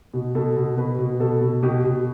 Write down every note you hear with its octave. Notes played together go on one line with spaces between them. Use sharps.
B2
B2 A4
B2
B2 B4
B2
B2 A4
B2
B2 G4
B2